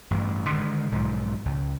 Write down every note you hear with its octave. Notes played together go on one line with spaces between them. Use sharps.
A1 G2
D3 D#3 G#3
B1 G#2 F3
C#2